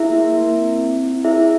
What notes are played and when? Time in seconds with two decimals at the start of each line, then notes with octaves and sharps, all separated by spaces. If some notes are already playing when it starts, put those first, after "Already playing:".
Already playing: E4 G#4 E5
0.10 A#3
0.33 A#3
0.55 C4
0.79 C4
1.02 E4
1.24 E4 G#4 E5